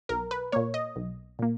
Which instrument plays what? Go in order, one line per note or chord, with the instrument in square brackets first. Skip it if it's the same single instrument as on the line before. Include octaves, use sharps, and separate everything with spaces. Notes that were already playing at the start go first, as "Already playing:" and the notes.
[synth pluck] B1 A#4
B4
A#2 A#3 C#5
D#5
B1
A#2 A#3